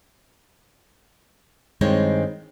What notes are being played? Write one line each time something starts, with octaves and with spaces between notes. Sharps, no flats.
G2 D#3 G#3 C4 D#4 C#5